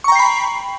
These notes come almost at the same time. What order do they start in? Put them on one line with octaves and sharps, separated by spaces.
C#6 A#5 G5 C7 B5